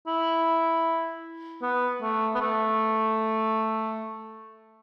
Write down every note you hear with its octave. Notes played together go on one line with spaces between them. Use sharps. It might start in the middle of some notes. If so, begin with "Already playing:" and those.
E4
B3
A3
B3
A3